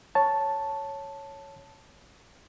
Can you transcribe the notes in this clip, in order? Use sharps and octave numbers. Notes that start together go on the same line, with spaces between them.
C#5 A5